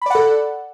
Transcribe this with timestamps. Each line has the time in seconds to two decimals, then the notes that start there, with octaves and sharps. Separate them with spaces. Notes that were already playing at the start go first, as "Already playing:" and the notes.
0.02 B5
0.06 D5
0.10 F#5
0.15 A4